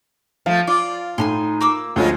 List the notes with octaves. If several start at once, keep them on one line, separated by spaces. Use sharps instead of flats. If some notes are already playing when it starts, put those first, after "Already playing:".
F3 A3 F5
F4 D5
A2 D#4 G#5 A#5 C6
A#3 D6 E6
D2 F3 G#3 C#4 F4